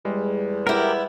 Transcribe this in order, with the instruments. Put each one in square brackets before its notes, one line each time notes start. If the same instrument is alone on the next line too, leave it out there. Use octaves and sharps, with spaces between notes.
[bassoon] E2 [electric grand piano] G3 G#3
[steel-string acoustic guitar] B3 E4 [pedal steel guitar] G4 A#4